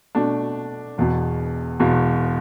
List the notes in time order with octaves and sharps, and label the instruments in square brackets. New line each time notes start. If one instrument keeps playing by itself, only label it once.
[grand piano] B2 A3 D4
E1 E2 B2
E1 E2 B2